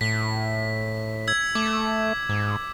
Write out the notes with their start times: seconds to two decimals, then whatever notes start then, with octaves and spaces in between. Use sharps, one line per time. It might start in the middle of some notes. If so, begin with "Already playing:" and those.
0.01 A2 B6
1.28 E6 G#6
1.55 A3 D6
2.29 G#2